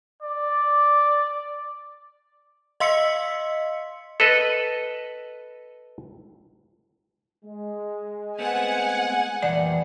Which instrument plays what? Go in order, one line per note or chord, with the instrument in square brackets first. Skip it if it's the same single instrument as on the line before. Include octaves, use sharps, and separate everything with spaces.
[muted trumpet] D5
[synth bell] D#5 F5 C6 E6 B6 C#7
[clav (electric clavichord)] A4 B4 D#5
[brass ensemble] G#3
[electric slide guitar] A3 B3 C4 [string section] F#5 G#5
[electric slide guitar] F2 E3 F#5 [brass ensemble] A#2 G3 A3 [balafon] D5